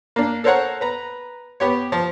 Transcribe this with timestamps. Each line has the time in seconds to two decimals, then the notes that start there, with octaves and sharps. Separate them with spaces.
0.16 A#3 D4
0.44 A4 A#4 C5 C#5 F#5 A#5
0.81 B4 A#5
1.60 B3 G4 C#5
1.92 F3